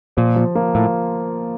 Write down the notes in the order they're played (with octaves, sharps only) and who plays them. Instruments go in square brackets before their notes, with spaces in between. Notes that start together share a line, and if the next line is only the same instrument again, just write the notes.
[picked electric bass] A#2 [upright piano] F3
[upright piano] F3
A#3
[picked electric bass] A2 [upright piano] F4